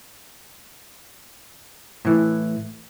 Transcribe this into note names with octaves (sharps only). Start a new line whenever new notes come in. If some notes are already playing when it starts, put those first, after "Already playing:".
A2 E3